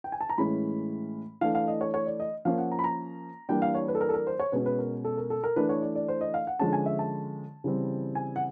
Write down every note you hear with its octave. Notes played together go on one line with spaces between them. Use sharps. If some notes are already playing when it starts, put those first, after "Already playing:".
G5
G#5
A5
A#5
A2 E3 G#3 C#4 B5
E3 A3 D4 F5
F5
D#5
C#5
C#5
D5
D#5
F3 A#3 C#4 F5
F#5
A#5
B5
A#5
E3 G3 A#3 D4 G5
F5
C#5
B4
A4
A#4
A4
A#4
C5
C#5
B2 G#3 C#4 B4
B4
A#4
A4
A#4
A4
A#4
E3 A3 D4 B4
C#5
D5
D5
C5
D#5
F5
F#5
D3 F3 G#3 C#4 A5
G#5
E5
A5
C#3 E3 G3 C4
G#5
F#5